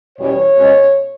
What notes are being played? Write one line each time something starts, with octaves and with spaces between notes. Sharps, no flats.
E2 B2 G3 C#4 C#5
B2 G#3 C#4